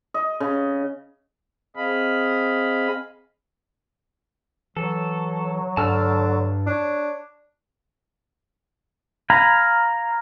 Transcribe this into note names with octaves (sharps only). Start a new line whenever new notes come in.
D#5
C#3
C4 G#4 D#5 F5 B5
E3 F#3 A4
G2 D3 A5 E6 F6
D4 C#5
F5 G#5 A#5 B5